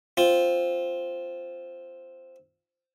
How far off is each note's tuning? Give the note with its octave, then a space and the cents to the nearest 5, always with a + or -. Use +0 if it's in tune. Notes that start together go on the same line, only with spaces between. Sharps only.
C4 +0 F4 +0